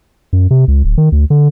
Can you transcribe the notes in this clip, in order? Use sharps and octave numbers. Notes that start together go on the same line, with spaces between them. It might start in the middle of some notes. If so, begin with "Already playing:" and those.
F#2
C3
C#2
D1
D#3
D2
D3